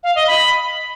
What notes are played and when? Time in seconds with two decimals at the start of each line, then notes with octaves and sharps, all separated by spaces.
0.04 F5
0.16 D#5
0.28 B5